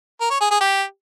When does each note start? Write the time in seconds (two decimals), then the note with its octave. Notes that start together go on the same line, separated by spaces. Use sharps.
0.21 A#4
0.31 C#5
0.41 G#4
0.51 G#4
0.61 G4